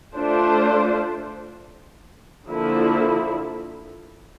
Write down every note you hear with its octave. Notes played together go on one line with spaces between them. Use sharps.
A3 D4 F4 C5
D3 F3 A#3 E4